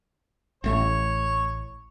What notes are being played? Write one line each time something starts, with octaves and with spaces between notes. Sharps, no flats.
A1 A3 C#5